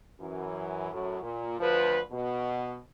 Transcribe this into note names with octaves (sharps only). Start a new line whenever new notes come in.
F#2 E3
F#2 A2 F#3
A#2
D2 F3 B4
B2